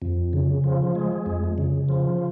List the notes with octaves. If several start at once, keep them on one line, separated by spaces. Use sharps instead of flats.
F2
C#3
F3
G#3
F2
C#3
F3